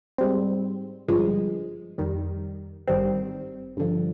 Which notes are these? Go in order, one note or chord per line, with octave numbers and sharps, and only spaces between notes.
G#2 G3 C4
G1 G2 F3 G#3
F2 D#3 G3
G#1 G2 D#3 G3 C4
G2 D3 F3